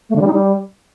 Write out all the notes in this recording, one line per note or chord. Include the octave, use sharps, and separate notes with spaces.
A3
D3
G3
D#4
G3